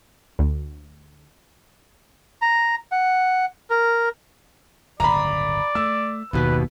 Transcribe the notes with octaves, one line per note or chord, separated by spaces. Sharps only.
D2
A#5
F#5
A#4
D1 G1 C#3 D5 A#5 B5
A3 E6
F#1 D#2 B2 B3 B4